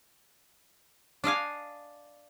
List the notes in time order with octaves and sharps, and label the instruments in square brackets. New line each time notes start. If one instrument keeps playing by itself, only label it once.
[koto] D4 D#5 F5 G#5